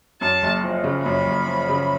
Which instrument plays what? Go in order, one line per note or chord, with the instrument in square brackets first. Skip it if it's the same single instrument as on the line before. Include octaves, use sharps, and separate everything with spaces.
[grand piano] F#2 [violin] A5
[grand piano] F#1
F3
C#3
[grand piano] F#2 [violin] B5
[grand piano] F#1
F3
C#3